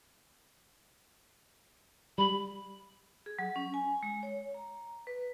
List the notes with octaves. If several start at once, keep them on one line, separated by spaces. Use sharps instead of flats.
G3 B5
G#4
F#3
C#4
G#5
G#3
C#5
A#5
B4